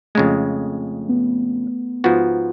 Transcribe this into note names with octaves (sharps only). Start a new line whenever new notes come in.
F2 C#3 G#3 A3
B3
G#2 F3 B3 F4 F#4